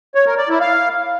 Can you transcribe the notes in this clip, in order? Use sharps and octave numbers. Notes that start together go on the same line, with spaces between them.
C#5
A#4
D5
E4
F5